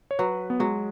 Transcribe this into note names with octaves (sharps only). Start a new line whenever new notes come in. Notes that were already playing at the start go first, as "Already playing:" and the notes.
C#5
F#3 B4
B3
F#3 G#3